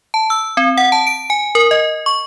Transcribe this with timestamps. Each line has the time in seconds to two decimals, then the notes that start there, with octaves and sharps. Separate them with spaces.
0.14 A5
0.30 E6
0.57 C4
0.77 F#5
0.92 A5
1.07 D7
1.30 G#5
1.55 A#4
1.71 D#5
2.06 C#6